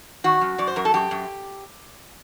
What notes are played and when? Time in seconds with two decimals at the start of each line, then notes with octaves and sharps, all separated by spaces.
0.24 D#3 F#4
0.41 F#2
0.58 F#2 D5
0.67 C5
0.76 F#2 A#4
0.85 A4
0.94 F#2 G4
1.11 F#2